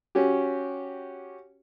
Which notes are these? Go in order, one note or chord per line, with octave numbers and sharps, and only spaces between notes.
C#4 F#4 G4